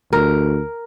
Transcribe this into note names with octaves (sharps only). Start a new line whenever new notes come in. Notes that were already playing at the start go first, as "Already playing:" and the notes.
D2 A#4